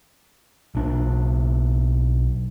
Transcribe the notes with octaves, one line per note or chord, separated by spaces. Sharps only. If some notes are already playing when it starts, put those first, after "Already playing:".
B1 D4